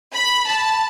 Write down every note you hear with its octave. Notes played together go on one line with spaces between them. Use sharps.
B5
A5